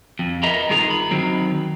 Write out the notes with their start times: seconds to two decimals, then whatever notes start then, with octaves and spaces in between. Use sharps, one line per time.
0.19 F2
0.43 A#4 B4 D#5 E5 A#5 B5
0.70 G2 D#3 F4 G#4 A#5
0.90 B5
1.11 D#3 F#3 C4